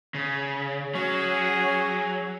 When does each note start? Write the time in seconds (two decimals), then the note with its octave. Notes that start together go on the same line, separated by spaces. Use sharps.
0.14 C#3
0.95 F#3 C#4 G#4